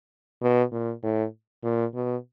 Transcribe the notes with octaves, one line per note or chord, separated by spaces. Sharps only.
B2
A#2
A2
A#2
B2